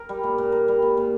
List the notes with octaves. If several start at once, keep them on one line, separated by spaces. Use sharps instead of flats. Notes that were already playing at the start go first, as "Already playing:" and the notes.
Already playing: A#4
G3
A#2
A#2
A#4
G3
A#2
A#2